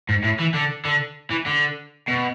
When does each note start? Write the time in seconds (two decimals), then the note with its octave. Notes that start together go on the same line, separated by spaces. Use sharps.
0.09 G#2
0.24 A2
0.39 E3
0.54 D3
0.85 D3
1.31 E3
1.46 D3
2.08 B2